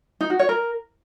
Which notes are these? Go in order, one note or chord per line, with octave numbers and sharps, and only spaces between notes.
D#4
F#4
C#5
A#4